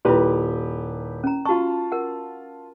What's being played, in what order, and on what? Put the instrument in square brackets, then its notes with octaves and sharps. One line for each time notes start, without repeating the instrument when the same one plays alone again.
[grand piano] D#1 G4 B4 [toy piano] E4 F4 C6
[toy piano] C#4 A#5
[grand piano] F4 A5 [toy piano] F#4 C#6
[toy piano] A#4 F#5